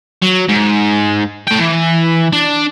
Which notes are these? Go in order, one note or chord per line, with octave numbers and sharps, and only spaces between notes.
F#3
G#2
A3 G5
E3
D4